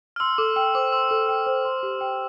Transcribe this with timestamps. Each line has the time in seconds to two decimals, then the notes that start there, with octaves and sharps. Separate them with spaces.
0.16 F6
0.20 C6 E6
0.38 A4 D6
0.56 G5 E6
0.75 C5 D6
0.92 C6 E6
1.11 A4
1.29 G5
1.47 C5
1.65 C6
1.83 G4
2.01 G5